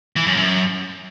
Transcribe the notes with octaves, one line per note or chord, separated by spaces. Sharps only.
E3
F#2
F#2